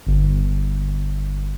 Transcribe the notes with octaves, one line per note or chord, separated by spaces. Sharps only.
G1